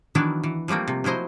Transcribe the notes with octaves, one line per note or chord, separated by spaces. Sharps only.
D#3 E3 F#3 B3 D4 E4
E3
F3 G3 A3 A#3 C4
C3
F3 F#3 E4 C5 D#5